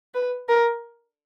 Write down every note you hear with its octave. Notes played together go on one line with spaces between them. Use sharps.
B4
A#4